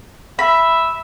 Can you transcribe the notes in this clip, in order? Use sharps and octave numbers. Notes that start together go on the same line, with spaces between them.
E5 B5